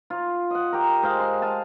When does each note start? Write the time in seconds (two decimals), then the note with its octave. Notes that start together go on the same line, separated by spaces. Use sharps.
0.10 F4
0.51 D#5 F#5
0.73 G4 A#4
1.02 G#3 C5 F5
1.20 C6
1.42 F5 G#5 A5